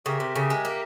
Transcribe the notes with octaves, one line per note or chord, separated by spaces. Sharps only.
C#3 G4 A#4 E5
C3
C#3
G#3
A#3